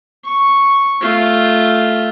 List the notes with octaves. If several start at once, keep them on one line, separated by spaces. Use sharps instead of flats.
C#6
A3 F4